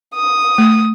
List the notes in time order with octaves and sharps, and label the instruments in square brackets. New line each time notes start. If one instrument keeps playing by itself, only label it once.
[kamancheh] D#6
[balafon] A3